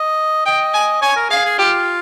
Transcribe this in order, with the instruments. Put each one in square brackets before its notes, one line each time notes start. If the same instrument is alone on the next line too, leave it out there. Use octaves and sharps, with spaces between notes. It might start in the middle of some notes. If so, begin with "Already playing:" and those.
Already playing: [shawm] D#5
[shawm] D#5 [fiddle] G5
[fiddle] G#5
[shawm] C#5 [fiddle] G#5
[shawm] A#4
[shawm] G#4 [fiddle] F5
[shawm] G#4
[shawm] F4 [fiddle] G4